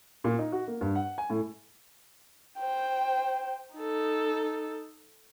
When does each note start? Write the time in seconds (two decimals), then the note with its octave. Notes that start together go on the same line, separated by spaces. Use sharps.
0.24 A#2
0.39 D#4
0.52 F#4
0.68 A#3
0.81 G2
0.95 F#5
1.18 G#5
1.30 A2
2.59 C5 G5
3.76 D#4 A4